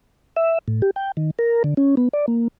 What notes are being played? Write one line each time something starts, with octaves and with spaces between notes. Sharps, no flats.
E5
A2
G4
G5
D#3
A#4
D3
C#4
B3
D5
A#3